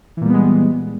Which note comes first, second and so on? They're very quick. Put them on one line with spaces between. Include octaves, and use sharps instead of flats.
E3 A#2 G3 B3 G#3